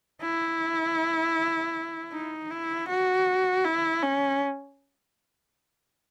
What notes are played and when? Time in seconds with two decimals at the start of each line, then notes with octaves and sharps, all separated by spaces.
0.22 E4
2.12 D#4
2.51 E4
2.89 F#4
3.64 E4
4.03 C#4